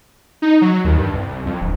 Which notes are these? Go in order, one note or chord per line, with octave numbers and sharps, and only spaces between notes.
D#4
F#3
D#2
G2
C2
C2
F2
D1